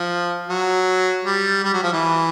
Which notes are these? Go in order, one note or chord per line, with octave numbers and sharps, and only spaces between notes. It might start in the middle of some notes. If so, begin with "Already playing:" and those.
Already playing: F3
F#3
G3
G3
F#3
F3
E3